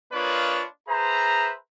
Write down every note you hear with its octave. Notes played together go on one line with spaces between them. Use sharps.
A#3 D4 F4 B4 C#5 D#5
G#4 B4 C5 E5 A#5